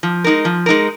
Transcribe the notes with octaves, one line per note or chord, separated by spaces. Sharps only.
F3
G#3 D#4 A#4
F3
G#3 D#4 A#4